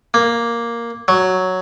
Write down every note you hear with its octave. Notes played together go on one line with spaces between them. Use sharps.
A#3
F#3